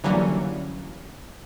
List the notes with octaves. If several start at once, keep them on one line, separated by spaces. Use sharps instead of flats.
D3 E3 F#3 G3 A#3 C#4